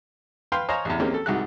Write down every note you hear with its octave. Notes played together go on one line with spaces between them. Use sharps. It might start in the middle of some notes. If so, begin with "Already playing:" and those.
B4 F5 G5 C6
C5 C#5 D#5 F5 G#5 A#5
A1 E2
G#3 A#3 C4 C#4 G4
A4
C2 G#2 F#4 F#6